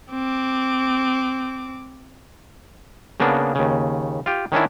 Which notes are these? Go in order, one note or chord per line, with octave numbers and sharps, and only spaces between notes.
C4 D6
C#3 A#3 B3 D4
D#2 C#3
F4 G4
D#3 C#4 D4 E4